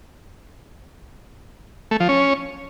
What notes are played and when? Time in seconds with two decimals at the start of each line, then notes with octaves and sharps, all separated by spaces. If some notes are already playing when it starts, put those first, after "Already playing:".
1.91 A3
2.00 F3
2.09 C#4